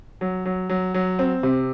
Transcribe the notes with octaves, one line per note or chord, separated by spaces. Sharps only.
F#3
F#3
F#3
F#3
C4
C3